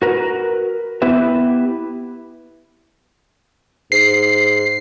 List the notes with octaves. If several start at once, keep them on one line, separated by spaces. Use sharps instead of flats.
F#4 A#4 B4
B3 E4 G4 B4 E5
G#2 C7